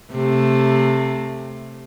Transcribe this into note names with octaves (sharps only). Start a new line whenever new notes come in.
C3 A3